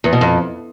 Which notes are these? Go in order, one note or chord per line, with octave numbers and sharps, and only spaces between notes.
E2
B2
F2